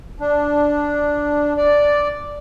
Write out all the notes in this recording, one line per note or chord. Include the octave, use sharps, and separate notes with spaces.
D4
D5